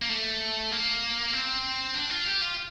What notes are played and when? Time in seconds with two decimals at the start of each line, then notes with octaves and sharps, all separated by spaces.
0.02 A#3
0.10 A3
0.72 A#3
1.33 C4
1.95 D4
2.10 F4
2.26 G4
2.42 F4